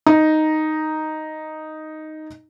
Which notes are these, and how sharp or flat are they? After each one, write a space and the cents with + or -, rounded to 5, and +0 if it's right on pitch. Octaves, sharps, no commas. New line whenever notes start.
D#4 +0 A#5 +0